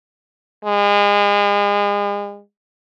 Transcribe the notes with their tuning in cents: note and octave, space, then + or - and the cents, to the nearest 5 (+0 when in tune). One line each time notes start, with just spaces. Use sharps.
G#3 -35